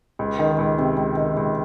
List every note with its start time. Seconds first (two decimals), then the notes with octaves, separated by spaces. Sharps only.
0.19 C#2
0.39 D#3
0.58 C#2
0.78 C3
0.97 C#2
1.17 D#3
1.37 C#2